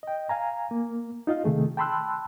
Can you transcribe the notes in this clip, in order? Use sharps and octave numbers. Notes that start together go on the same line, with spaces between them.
D#5 G5
F5 G#5 A#5
A#3
D#4 F4 D#5 F5
C3 D#3 A3 G#4
G5 A5 B5 C6 E6 F#6